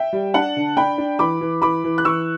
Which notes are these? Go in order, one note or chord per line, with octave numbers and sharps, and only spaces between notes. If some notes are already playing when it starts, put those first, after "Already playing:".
Already playing: E5 G5
G3
D4 F#5 A5
D3
D4 G5 B5
D4
E3 B5 D6
E3
E3 B5 D6
E3
F#6
E3 C#6 E6